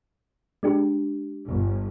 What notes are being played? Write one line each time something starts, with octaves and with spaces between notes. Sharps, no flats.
G#3 D4 G4
G1